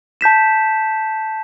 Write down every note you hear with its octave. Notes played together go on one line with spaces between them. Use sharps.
A5 G6 B6 E7